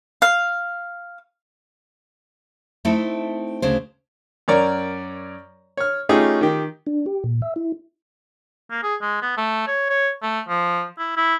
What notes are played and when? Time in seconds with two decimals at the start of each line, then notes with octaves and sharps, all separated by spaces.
0.22 F5
2.85 A3 C4 D#4 E4 A4
3.62 D2 C#3 C5
4.48 F#2 A#4 C#5 D5 A#5
5.77 C#5 F6
6.09 A3 C#4 D#4 F4 G4 G#4
6.41 D#3 G4
6.87 D4
7.06 G4
7.24 A#2
7.42 E5
7.56 E4
8.71 A#3
8.83 G#4
9.02 G#3
9.22 B3
9.37 A3
9.67 C#5
9.90 C#5
10.22 A3
10.48 F3
10.99 E4
11.17 E4